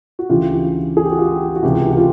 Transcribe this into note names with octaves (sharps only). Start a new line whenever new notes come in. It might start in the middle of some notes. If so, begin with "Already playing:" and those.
F#4
D2 C#3 E3 F4 G4
G#4
G4
F#4
F4 G4
F#4
C#2 C3 E3 F4 G4
F#4
F4 G4